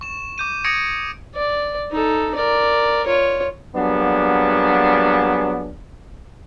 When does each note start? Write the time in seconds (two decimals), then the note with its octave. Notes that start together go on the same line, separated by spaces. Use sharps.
0.01 C#6 E7
0.38 D6 G6 D#7
0.64 C#6 D#6 G#6 A#6 C#7 D7
1.35 D5
1.91 D#4 A4
2.35 A#4 D5
3.06 F4 C#5
3.75 F#3 G3 A#3 B3 D4 G#4